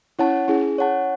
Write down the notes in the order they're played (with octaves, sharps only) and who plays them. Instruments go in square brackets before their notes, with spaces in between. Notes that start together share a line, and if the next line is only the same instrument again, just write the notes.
[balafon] C#4 E4 [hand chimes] C#5 F#5 A5
[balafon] C#4 E4 [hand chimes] G#4
[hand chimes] C#5 F#5 A5